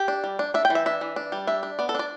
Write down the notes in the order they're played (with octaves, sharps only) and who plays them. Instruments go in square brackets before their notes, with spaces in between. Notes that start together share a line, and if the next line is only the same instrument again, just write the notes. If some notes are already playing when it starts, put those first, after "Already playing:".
Already playing: [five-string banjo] G4
D4
G3
D4
D4 E5
G5
E3
E5
D4 E5
E3
D4
G3
D4 E5
D4
B3 D5
A4
D4 D5